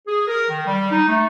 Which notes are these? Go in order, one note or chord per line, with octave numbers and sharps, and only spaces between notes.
G#4
A#4
D#3
G3
D#4
A3